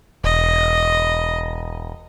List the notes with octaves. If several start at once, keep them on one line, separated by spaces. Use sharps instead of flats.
E1 D#5